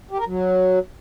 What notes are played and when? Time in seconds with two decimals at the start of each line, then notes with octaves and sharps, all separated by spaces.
0.11 G4
0.18 A#4
0.26 F#3